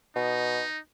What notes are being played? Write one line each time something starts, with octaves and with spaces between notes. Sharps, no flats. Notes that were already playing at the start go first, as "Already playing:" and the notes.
B2 D#4